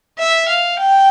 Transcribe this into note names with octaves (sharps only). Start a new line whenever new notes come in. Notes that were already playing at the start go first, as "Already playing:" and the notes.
E5
F5
G5